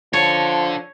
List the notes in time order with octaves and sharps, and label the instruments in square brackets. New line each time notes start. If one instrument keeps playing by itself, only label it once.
[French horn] F3 [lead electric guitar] D4 A4 [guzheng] C#5